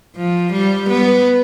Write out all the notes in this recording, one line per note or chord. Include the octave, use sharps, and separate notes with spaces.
F3
G3
B3